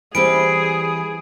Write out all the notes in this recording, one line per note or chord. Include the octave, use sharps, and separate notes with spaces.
E3 G3 C4 G#4 D7